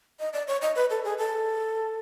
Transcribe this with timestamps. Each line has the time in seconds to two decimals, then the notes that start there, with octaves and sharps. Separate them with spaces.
0.19 D#5
0.33 D5
0.47 C#5
0.62 D#5
0.76 B4
0.90 A4
1.04 G#4
1.18 A4